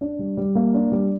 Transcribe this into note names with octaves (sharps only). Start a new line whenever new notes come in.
D4
G3
G3
A#3
D4
G3